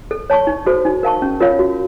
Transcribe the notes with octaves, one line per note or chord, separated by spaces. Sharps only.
A4
C#5 A5 C#6
D#4
F#4 A4 C5
D#4
A#4 F5 A5 C#6
C#4
F4 A#4 C#5 F5
F#4